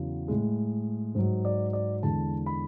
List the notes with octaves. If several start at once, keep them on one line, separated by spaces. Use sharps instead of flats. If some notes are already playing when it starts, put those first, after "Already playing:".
Already playing: E2 C#3 F#3
A2 G#3
G#2 F#3
D5
D5
E2 D3 G#3 A5
B5